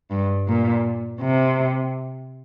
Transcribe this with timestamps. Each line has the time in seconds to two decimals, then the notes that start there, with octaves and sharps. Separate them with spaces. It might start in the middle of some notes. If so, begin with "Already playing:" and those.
0.11 G2
0.48 A#2
1.21 C3